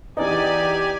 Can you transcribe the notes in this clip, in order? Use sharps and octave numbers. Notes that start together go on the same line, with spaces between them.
E2 D#4 G4 D5 G#5